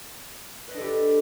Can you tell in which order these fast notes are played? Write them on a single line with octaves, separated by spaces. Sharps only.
B4 D#5 D4 A4 G4